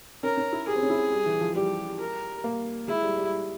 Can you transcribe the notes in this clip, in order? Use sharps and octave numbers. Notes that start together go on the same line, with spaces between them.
C#4 A#4
C#4
E4
G4 G#4
C4
C#4
E4
G3
E3
F3
G3 G4
A#4
A#3
G#3 E4
G3
G3